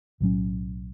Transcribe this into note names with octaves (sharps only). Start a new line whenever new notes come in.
B1 A2 F#3 C#4